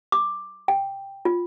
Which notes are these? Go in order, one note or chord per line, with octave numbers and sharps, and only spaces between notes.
D6
G5
F4